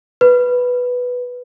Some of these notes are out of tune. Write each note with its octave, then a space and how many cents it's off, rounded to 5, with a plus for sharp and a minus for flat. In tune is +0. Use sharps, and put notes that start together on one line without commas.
B4 +0